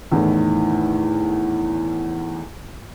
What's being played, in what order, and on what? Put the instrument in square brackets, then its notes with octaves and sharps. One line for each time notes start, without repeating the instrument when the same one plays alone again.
[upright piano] E2 A2 D#3